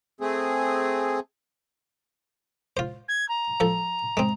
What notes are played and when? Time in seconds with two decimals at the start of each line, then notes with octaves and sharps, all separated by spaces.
0.21 A3 C4 G#4
2.77 F4 C5
3.08 G#6
3.28 A#5
3.60 F3 A4
4.17 G#3 C4